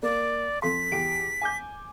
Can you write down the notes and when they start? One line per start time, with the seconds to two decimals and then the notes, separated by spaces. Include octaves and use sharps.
0.03 A#3 D5
0.62 F2 A4 C6 B6
0.92 E2 G4 D7
1.41 G#5 D6 G6